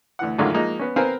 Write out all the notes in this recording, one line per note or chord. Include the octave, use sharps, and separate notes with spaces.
D2 E3 F#5
A1 F#2 D3 D#3 G#3 F4
F3 G#3 A#3 D#4
B3 C#4
B3 C4 A#4 C5 F5 G#5